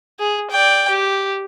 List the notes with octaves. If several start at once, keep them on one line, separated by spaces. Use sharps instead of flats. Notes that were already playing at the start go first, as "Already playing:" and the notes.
G#4
D5 G5
G4